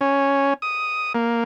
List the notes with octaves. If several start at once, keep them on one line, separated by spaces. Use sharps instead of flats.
C#4
D#6
A#3